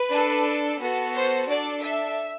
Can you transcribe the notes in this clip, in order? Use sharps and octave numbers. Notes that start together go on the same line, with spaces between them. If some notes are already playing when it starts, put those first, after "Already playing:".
Already playing: B4
D4 A4
B3 F#4 A4
C5
D4 A4 D5
E5